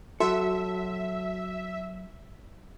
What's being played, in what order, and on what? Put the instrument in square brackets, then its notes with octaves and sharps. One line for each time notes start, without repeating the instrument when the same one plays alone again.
[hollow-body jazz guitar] F#3 A4 [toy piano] F#4 [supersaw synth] E5